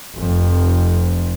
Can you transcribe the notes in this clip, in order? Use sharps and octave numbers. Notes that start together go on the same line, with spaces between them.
F1 F2